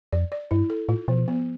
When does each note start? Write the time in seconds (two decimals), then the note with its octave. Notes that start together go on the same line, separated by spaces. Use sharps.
0.13 F2 D5
0.32 D5
0.51 G2 E4
0.70 A4
0.89 A2 F4
1.08 B2 F3
1.28 B3